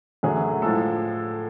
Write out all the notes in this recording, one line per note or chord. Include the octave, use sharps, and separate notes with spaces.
F#2 D3 F#3 A3 G#4
A2 F3 G#3 A4